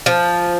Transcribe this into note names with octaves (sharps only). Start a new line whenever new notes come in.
F3